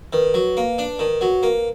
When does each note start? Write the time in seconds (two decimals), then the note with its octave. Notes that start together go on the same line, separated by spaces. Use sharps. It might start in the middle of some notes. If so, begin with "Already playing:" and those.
0.13 D#3 B4
0.34 F#3
0.57 A#3
0.78 D4
0.99 D#3
1.21 F#3
1.43 A#3